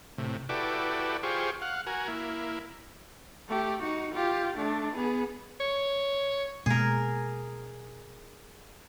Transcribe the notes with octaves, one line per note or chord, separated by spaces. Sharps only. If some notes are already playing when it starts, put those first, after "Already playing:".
A2 C3
E4 F#4 G4 A4 B4 D5
F4 G4 G#4 C5 C#6
F5 F#5
F#4 A#4 G#5
A#3 E4
A3 G4
D#4 F#4
F4 G4
A3 D4
B3 G#4
C#5
B2 G#3 A#3 G#4 A#4